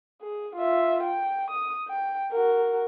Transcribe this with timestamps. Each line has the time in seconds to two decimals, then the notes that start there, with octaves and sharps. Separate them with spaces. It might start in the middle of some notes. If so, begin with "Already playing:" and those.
0.22 G#4
0.56 F4 E5
1.03 G5
1.50 D#6
1.88 G5
2.31 F#4 A#4